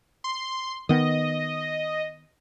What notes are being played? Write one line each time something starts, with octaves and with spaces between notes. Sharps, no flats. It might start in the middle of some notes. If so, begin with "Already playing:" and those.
C6
D#3 B3 D#5